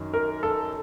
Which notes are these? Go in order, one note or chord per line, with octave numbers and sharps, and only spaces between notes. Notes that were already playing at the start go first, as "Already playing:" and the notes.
Already playing: F#2 D#3
A#4
A4